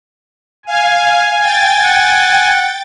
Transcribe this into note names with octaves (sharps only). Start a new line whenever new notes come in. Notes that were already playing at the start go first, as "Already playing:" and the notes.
F5 G#5
G5 A6
F#5